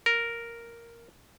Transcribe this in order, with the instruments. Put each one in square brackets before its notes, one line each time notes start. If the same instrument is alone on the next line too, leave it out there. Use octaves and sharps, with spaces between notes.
[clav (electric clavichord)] A#4